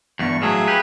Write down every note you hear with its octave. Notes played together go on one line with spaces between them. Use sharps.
E2 G2 C#6
A2 F#3 G#4 E5 F5
G4 B4